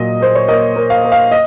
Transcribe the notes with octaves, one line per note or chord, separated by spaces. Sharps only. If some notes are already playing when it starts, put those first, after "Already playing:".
Already playing: A#2 F#3 D#5
A#3 C5
C#5
A#3 D#5
A#3
F5
A#3
F5
D#5